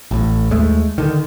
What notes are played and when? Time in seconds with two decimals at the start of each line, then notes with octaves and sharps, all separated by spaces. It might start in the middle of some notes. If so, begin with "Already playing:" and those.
0.11 A1 A2
0.51 D#2 G#3 A3
0.98 D3 D#3